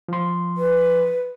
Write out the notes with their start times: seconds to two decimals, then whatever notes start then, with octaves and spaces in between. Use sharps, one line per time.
0.08 F3 C6
0.57 B4